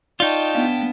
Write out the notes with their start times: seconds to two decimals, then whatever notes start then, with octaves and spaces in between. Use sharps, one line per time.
0.20 D#4 F4 D5 D#5 G5 A5 C#6
0.55 B3 D4 F5